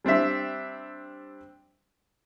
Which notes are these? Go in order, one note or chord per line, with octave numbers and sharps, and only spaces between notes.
G3 C4 D4 E5